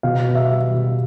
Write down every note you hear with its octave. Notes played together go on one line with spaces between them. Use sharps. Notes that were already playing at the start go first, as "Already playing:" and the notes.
B2 F5
B3
E5
G3
B2